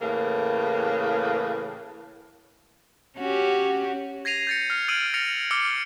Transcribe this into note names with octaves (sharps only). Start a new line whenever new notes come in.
A2 C#3 E3 A#3
C#4 F#4 G4
G#6 A#6 C7 D#7 F7
G6 A6 C#7
F6 C7 F7
E6 F6 G#6 D7 D#7 F#7
F6 A6 A#6 C#7 F7
D6 E6 F6 C#7 G7